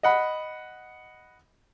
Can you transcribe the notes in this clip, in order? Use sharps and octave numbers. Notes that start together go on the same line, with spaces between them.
D#5 F#5 B5